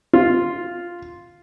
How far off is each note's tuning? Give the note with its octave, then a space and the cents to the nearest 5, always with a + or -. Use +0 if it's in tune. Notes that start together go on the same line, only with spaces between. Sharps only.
F4 +0